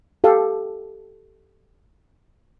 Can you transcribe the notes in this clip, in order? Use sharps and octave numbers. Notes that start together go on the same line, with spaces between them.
G4 A4 F5